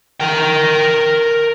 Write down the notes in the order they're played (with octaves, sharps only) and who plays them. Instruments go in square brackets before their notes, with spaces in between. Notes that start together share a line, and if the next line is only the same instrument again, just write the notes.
[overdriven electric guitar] A#4 G5